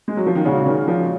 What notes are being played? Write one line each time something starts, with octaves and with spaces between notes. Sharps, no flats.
G#3
F#3
F3
D#3
A#2 C#3 G#3 C#4 F#4
C#3
D#3
F3